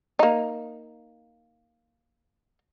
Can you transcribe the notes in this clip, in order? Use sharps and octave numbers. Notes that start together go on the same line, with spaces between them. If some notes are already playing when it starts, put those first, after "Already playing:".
A#3 D#4